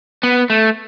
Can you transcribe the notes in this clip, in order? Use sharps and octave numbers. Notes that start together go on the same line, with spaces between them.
B3
A3